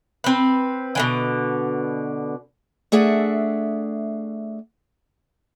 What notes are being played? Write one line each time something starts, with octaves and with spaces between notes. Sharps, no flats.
C4 B4
B2 D3 E3
A3 D4 G#4 E5 F#5